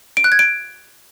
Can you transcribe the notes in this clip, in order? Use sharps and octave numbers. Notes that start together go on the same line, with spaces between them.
D7
F#6
G#6
D7